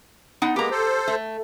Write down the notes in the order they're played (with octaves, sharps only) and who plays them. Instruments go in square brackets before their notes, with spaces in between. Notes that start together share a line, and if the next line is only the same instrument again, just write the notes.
[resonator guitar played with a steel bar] B3 D#4 F#5
[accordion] G#3 A#3 B3 [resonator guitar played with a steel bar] G4 A#5
[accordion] A4 C5
[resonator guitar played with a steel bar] A3